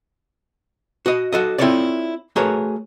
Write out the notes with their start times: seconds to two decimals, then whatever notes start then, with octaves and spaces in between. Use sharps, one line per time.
1.06 F#4 D#5
1.33 F#4 A4 D#5
1.58 C4 E4 F4 A4 C#5 D5
2.36 A3 F#4 G#4 A#4 B4 C#5